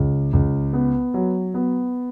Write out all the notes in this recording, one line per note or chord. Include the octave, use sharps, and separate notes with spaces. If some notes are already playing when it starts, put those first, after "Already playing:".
Already playing: C#2
C#2
B3
F#3
B3